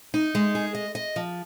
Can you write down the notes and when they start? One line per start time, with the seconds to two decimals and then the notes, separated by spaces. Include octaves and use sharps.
0.14 D#4
0.35 G#3
0.55 G#4
0.75 D#5
0.95 D#5
1.16 F3